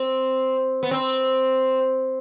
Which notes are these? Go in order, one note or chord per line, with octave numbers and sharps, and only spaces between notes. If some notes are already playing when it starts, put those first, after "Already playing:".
Already playing: C4
B3
C4